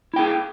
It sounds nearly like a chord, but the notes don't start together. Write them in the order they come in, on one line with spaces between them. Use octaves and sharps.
E4 G5 G#4